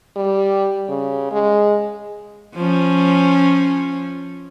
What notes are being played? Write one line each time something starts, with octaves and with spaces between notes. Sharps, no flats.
G3
C#3
G#3
F3 C#4